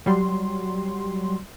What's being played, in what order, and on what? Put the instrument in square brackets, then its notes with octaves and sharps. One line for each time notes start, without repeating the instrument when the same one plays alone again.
[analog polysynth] F#3 G3 C6